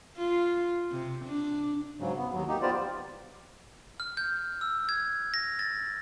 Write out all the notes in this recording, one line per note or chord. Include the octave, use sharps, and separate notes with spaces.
F4
C3
D4
G#2 C#3 F#3
B3
D#2 F#3
A#3 D#4 G4
B3 F4 G4 C5 D5
F6
G6
E6
G#6
A#6
A6